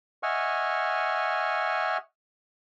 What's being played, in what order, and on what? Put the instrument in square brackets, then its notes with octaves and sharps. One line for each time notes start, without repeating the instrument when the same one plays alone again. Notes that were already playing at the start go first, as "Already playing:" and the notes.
[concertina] D#5 E5 F#5 G#5 C#6 F6